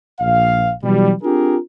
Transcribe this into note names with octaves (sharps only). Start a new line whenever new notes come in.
A#1 F5
B2 E3 F#3 G3
C4 D4 F4 G4 G#4 A#4